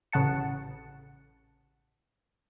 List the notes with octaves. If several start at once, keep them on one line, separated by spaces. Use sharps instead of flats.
A1 C#3 F#5 A5 C#7